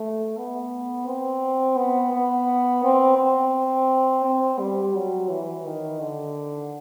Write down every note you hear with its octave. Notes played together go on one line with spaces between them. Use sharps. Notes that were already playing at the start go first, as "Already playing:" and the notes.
Already playing: A3
B3
C4
B3
B3
C4
C4
C4
G3
F#3
E3
D#3
D3